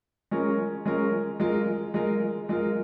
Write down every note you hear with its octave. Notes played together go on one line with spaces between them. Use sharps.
G#3 C#4 F4 A#4
G#3 C#4 F4 A#4
G#3 F4 A#4
G#3 F4 A#4
G#3 F4 A#4